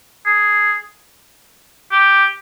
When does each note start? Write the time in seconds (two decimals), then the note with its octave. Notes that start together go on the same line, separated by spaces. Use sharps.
0.26 G#4
1.92 G4